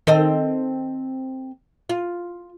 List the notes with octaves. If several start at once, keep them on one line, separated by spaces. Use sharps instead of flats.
D#3 C4 A4 D#5
F4